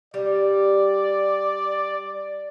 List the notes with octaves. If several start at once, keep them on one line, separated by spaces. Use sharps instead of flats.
G3 D5